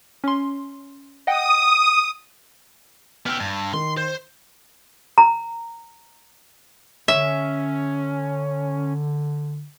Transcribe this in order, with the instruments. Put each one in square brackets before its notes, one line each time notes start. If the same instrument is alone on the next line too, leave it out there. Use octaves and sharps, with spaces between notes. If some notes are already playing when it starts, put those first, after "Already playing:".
[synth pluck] C#4 C6
[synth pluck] D#5 F#5 G5 [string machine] D#6
[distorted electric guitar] B3 G4 [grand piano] E6 F6
[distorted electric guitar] G2
[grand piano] D#3 [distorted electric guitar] C6
[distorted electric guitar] C5
[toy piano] A#5
[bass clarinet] D3 [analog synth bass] C#4 [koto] E5